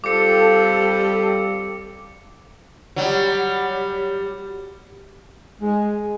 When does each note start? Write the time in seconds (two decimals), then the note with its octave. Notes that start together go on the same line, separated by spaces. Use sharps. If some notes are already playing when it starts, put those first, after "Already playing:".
0.04 G3 C4 F4 A4 D6 C#7
2.96 F#3 G3
5.62 G#3